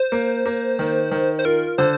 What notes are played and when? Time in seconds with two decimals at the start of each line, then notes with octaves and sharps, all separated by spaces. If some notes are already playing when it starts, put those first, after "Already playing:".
Already playing: C5
0.12 A#3
0.46 A#3
0.79 D#3
1.12 D#3
1.39 C5
1.45 F4 A#4
1.78 D3 C5